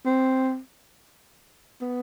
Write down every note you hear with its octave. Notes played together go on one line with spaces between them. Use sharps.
C4
B3